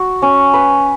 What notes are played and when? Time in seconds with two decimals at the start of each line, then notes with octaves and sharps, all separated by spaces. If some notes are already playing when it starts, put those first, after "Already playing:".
Already playing: F#4
0.22 C#4
0.54 B4